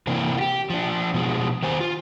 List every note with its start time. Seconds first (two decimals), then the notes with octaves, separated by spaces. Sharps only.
0.07 C3 E3 A#3 D4
0.37 F4 G4
0.70 F3 D4
1.14 B2 F3 G#3
1.63 D#3 G4 C5 G#5
1.80 F4